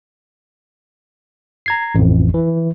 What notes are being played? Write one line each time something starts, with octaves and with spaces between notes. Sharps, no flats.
A#5 G#6 C7
A1 F2
E3